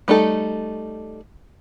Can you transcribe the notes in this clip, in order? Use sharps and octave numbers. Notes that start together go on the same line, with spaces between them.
G3 A3 D#4 A4